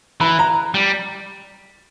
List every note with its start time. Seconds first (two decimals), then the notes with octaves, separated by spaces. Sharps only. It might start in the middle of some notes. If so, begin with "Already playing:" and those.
0.21 E3 B5
0.39 A#5
0.74 G3